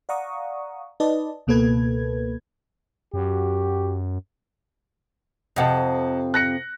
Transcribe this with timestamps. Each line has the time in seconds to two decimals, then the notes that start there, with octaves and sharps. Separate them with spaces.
0.09 D5 F5 F#5 A#5 C#6 D#6
1.00 D#4 B4 D5 D#5 A5
1.47 C#2 B2 A#3 A4 B4 G#6
3.14 F#2 F#4 G4
5.56 F2 C3 D#5 F#5 A5
6.34 F#6 A#6 C#7